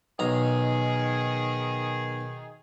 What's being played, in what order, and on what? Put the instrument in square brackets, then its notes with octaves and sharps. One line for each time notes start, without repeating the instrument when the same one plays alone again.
[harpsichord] B1 A#5 [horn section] D#3 G#4